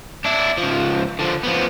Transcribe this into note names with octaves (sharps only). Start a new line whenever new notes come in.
D4 E4
C#2 F3
D3 F3
F3 B3